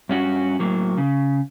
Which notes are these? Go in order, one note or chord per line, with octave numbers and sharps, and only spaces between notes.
G2 C#4 F#4
A2 F#3 A#3
C#3